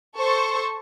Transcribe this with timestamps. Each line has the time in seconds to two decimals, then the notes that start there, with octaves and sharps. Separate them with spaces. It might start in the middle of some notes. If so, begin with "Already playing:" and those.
0.18 A4 C5 C#6